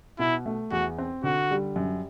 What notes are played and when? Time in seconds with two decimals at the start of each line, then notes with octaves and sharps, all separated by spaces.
0.19 B2 E4
0.46 A3
0.71 E2 F#4
0.98 C4
1.23 D3 F#4
1.51 G3
1.76 F#2